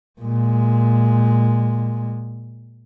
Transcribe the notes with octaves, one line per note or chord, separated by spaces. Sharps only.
A#2 G#3